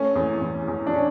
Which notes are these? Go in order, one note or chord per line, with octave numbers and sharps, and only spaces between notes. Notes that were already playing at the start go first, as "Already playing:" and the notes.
Already playing: A3 C#4
E2
E2
E2
D4
C#4